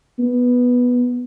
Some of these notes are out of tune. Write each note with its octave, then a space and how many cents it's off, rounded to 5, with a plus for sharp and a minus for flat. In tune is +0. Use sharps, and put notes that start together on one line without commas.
B3 -5